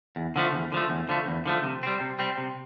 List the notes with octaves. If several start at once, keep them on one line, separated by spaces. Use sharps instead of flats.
E2
D3 F3 A3
E2
D3 F3 A3
E2
D3 F3 A3
E2
D3 F3 A3
C3
G3 C4
C3
G3 C4
C3